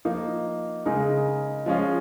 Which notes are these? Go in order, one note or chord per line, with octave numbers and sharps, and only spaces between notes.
F3 A#3 D#4
C#3 G#3 D#4 A#4
F3 G#3 C#4 F4